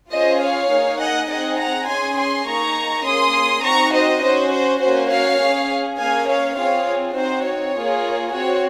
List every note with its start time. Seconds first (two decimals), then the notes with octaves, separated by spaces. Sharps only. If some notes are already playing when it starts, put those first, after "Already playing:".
0.12 C#4 F4 G#4 C5 D#5
0.41 C#5 F5
0.70 A#3 D#4 G#4
1.00 D#5 F#5
1.29 C4 D#4 G#4 D#5 F#5
1.59 F#5 A#5
1.88 C#4 G#4 G#5 C6
2.17 G#5 C6
2.46 A#3 D#4 G#4 A#5 C#6
3.05 A#3 C#4 G#4 C6 D#6
3.64 C4 D#4 F#4 A#5 C#6
3.93 C5 D#5
4.22 C#4 F#4 C5
4.52 C5
4.81 A#3 C#4 F#4 C5
5.10 C#5 F5
5.40 C#4 G#4
5.98 A#3 C#4 G#4 F5 G#5
6.28 C#5 F5
6.56 C4 F4 G#4 C#5 F5
7.15 C4 D#4 F#4 C5
7.44 C#5
7.74 A#3 F4 G#4
8.32 C4 F#4 C#5